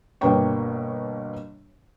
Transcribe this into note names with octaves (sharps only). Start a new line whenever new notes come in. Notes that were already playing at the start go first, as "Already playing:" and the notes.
G1 B2 A#3 C#5 G5 C#6